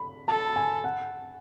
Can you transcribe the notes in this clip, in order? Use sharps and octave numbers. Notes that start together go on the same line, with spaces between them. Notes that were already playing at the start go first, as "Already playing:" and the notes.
Already playing: B5
A4 A5
G#5
F#5